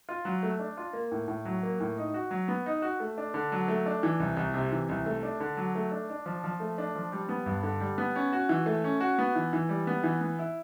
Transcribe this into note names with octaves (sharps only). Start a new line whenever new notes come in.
F4
F#3
A3
D4
F4
A#3
A2
A2
F#3
A#3
A2
D#4
F#4
F#3
B3
D#4
F#4
A3
D4
D3
F#3
A3
D4
E3
C2
C2
C3
E3
C2
A3
D4
D3
F#3
A3
D4
D4
F3
F3
A3
D4
F3
G3
B3
G2
D3
G3
B3
C#4
F#4
E3
A3
C#4
F#4
B3
E3
E3
G3
B3
E3
B3
E4